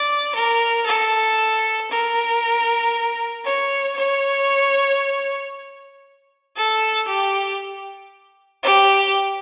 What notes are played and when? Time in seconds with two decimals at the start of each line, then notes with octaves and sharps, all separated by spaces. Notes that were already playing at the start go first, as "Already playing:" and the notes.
Already playing: D5
0.35 A#4
0.86 A4
1.91 A#4
3.45 C#5
3.97 C#5
6.56 A4
7.08 G4
8.63 G4